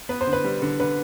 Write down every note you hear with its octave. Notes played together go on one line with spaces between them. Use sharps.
B3 B4
C5
D3
B4
G3
D3
D3 B4